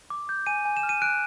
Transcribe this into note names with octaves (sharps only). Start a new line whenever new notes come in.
D6
G6
G#5 D#7
G#5
E7
F6
D#7
F#6 D7